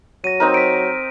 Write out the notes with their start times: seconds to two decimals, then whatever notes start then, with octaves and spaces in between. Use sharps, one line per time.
0.24 F#3 A#6 D#7
0.40 C4 D#4 A#4
0.54 B6 D7